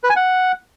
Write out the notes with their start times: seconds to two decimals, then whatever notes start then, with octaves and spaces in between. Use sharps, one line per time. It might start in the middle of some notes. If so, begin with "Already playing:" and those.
0.03 B4
0.10 G#5
0.16 F#5